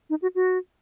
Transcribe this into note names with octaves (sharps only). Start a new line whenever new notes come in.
D#4
F#4
F#4